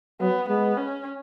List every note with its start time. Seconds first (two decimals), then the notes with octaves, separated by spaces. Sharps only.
0.21 F#3 B3
0.48 G#3 B3
0.77 C#4